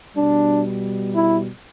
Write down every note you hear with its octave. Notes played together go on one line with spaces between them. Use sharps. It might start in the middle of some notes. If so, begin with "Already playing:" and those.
B2 G3 D4
E4